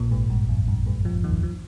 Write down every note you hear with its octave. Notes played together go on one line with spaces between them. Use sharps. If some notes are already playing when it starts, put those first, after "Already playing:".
Already playing: A#1 A#2
G#1 G#2
G2
F2
G2
G#1 G#2
F2 F3
D#2 D#3
F3